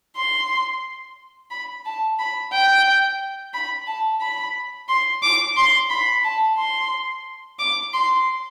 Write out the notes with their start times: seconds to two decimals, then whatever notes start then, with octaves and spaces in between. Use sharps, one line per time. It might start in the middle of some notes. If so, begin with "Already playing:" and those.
0.16 C6
1.51 B5
1.86 A5
2.19 B5
2.53 G5
3.54 B5
3.87 A5
4.21 B5
4.88 C6
5.22 D6
5.56 C6
5.90 B5
6.24 A5
6.57 C6
7.59 D6
7.93 C6